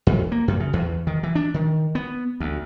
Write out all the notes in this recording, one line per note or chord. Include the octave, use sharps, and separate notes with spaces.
F2
A#3
F#2
C#3
E2
D#3
E3
D4
D#3
B3
D2